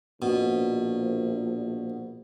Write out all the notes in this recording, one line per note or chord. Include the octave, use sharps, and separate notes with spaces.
A#1 B2